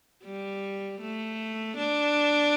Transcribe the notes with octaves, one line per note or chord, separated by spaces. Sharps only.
G3
A3
D4